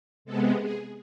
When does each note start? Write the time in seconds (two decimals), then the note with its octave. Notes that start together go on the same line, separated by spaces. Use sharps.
0.25 C3 G#3 B3 A4
0.60 G#4